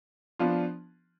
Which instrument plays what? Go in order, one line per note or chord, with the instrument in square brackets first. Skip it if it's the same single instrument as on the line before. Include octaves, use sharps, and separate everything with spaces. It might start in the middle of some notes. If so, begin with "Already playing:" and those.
[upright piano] F3 B3 D4 F4